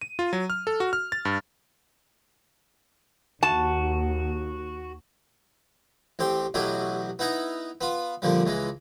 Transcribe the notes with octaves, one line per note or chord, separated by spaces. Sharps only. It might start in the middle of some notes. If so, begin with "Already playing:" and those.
D#7
F4
F#3
F6
A4
F#4
F6
A6
G2
D#2 F#4 A5
A1 C4 G4 G5
A1 B2 F#3 E4 G4
B3 D#4 E4 A#5
B3 F4
A#2 D3 F3 G3
C#2 E3 G#3